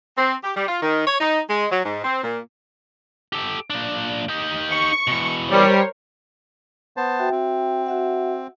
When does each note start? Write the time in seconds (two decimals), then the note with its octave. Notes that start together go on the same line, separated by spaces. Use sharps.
0.18 C4
0.43 G4
0.56 G3
0.68 F4
0.83 D#3
1.07 C#5
1.21 D#4
1.50 G#3
1.71 F#3
1.85 G#2
2.04 C4
2.23 A#2
3.33 G4 A4
3.70 A#2 D4
4.29 D#4 G4
4.70 C#6
5.07 B2 E3
5.51 G3 A#4 C5 C#5
6.97 B3 C5 A5
7.19 F#4 E5 G5
7.32 C4
7.86 F#4 E5 F#5